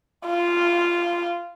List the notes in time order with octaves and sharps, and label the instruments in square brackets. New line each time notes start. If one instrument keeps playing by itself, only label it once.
[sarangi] F4